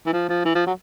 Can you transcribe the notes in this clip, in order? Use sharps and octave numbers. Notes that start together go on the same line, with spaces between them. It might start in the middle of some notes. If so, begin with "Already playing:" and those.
E3
F3
F3
E3
F3
F#3